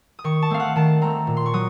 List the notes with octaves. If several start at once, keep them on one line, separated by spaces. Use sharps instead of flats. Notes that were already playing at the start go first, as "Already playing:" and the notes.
D#6
D#3 C#6
A5
A3 C4 F5
F#5
D#3 A5
A3 C4 A#5
A#2
C6
C#6
F#3 D#6